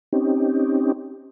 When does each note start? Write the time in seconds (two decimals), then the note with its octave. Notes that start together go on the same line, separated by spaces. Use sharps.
0.13 C4 C#4 D#4 G4